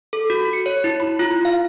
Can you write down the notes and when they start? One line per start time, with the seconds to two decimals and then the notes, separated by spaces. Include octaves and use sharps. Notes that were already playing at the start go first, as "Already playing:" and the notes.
0.13 A4
0.30 F#4
0.53 C#7
0.66 C#5
0.84 E4
1.00 B5
1.19 F4
1.45 F5